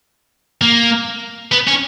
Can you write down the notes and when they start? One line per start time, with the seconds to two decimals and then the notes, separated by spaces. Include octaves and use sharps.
0.61 A#3
1.52 B3
1.67 C#4